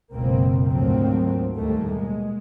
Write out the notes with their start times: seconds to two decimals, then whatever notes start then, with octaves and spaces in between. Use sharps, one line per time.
0.14 F#1 C#2 B2 A#3 C4
0.67 D2 G#2 F3 F#3 A#3 C4
1.54 D#2 G#2 G3 A3 A#3
1.89 B2 G#3